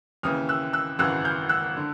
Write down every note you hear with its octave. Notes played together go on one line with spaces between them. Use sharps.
D#2 C#3 E3 D#6 F6
E6 F#6
E6 F#6
G#1 F#2 C#3 E3 E6 F#6
F6 G6
E6 F#6
D3